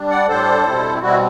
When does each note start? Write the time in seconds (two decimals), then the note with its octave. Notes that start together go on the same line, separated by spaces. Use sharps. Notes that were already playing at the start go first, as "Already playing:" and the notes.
Already playing: G3 D4
0.10 D5 F#5
0.28 A2 G3 D4 A4 C5
0.65 B2 G3 C4 E4
1.01 B2 G3 C4 E4 F#4